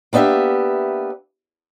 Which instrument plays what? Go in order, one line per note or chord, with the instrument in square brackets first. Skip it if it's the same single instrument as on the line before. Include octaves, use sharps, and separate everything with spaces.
[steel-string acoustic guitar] A#3 B3 D4 G4 E5